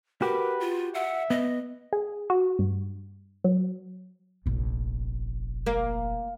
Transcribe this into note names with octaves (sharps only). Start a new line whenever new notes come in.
F#4 G4 A#4 B4
F4
E5 F#5
B3 D#5
G#4
F#4
G2
F#3
F1 A#1
A#3